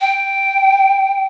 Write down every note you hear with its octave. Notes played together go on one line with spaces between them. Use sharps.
G5